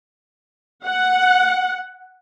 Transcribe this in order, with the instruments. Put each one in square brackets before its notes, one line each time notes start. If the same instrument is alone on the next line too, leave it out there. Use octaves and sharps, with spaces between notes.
[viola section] F#5